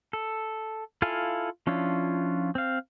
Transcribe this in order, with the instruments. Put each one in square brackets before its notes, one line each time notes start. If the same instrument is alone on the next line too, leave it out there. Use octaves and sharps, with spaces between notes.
[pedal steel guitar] A4
E4 F4 A4 F5 G#5
F3 C#4 D4 E4 F4
C4 F5